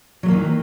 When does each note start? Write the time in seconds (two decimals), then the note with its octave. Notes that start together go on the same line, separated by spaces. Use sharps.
0.23 F#3
0.26 A3
0.28 A#3
0.31 E3
0.33 D#3